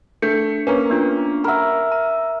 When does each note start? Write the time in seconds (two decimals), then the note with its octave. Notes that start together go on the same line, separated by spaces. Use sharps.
0.22 A3 D4 G6 C#7
0.67 A#3 C#4 B4 A#5
0.90 B3 D4 F4
1.44 A#4 E5 F#5 B5
1.92 A#5